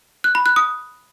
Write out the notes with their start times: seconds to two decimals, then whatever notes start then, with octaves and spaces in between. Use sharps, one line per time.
0.24 F#6
0.35 B5
0.46 F#6
0.56 D#6